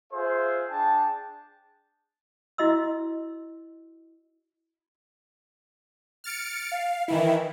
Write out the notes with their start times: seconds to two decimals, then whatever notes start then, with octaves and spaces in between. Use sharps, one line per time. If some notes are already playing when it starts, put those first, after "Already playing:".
0.13 F4 G#4 C5 E5
0.70 D4 G#4 G5 A5
2.58 E4 F#4 D#5 C6 E6
6.24 F6 A6 C#7 D7
6.72 F5
7.08 D#3 E3 E4